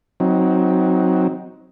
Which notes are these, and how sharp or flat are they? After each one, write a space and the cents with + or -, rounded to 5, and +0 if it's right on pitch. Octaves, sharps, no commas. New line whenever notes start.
F#3 +0 C4 +0 D#4 +20